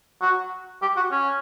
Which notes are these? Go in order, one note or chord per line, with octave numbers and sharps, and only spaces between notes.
F#4
G4
F#4
C#4